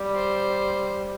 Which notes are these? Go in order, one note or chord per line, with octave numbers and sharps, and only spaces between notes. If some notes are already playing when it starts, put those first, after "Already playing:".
Already playing: G3
C5